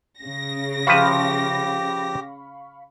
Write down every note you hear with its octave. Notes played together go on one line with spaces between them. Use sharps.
C#3 A#6
F3 G4 B4 E5 F5 B5 C#6